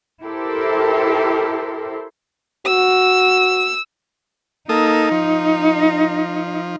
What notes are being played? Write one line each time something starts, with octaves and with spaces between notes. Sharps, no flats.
E4 G4 A4 A#4 C5
F#4 E6
A#3 D#4 A4 D#6
F3